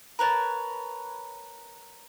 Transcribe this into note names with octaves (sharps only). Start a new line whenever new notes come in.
A#4 B4 C#5 A5